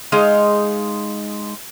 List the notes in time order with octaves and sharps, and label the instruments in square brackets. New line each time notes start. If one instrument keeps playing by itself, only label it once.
[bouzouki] G#3 D#4 F5